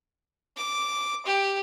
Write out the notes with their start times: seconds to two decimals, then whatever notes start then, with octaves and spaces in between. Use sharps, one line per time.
0.57 D6
1.26 G4